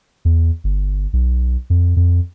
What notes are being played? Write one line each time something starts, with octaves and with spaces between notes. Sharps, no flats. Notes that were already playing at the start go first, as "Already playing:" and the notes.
E2
G1
B1
F2
F2